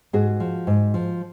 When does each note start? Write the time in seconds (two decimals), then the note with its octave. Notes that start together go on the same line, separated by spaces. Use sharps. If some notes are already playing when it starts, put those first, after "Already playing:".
0.13 G#2 F#4 G#4
0.40 F3
0.67 G#2
0.94 F3